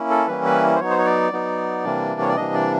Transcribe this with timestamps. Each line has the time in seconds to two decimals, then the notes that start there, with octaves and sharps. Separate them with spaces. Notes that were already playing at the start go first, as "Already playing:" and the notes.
Already playing: A#3 C#4 E4
0.10 A4
0.27 E3 G3 A#3 C#4 E4 B4
0.45 B4
0.75 C5
0.79 F#3 B3 D#4 C#5
0.90 C5
0.98 C#5
1.06 D5
1.32 F#3 B3 D#4
1.84 C3 E3 G3 A#3 D4
2.21 C#5
2.29 D5
2.37 C3 E3 G3 A#3 D4 D#5
2.54 D5